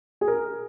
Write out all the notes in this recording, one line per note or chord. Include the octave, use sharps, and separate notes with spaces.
G#4
A#4